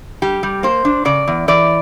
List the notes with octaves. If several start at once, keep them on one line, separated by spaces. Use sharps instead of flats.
G3 G4
G3
A#3 C5
D4
C#3 D5
E2
E3 D5